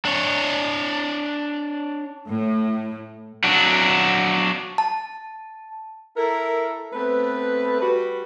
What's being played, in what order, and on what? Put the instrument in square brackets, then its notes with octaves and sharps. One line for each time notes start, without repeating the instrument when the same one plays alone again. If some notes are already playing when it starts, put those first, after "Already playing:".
[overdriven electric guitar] D4 C#5
[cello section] A2
[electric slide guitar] F#3 D4
[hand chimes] A5
[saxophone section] E4 A4 A#4
A3 B3 C4 B4
G3 F#4 B4